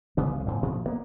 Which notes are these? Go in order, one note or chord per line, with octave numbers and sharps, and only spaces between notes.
C2 C#3 B3
C2 C3
D2 A2 C#3 C4
D2 A#2 F3
G2 A#3 B3